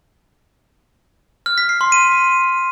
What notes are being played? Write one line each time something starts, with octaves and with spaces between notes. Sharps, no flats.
F6
B6
C7
C6
D#7